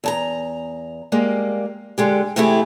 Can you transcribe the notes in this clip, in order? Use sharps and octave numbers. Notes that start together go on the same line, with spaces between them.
E2 A5 A#5
G3 G#3 A#3
D3 G#3 G4
C3 E3 A3 E4 G4 G#4